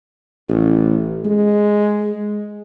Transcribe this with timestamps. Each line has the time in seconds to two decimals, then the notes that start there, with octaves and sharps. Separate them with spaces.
0.49 A1
1.25 G#3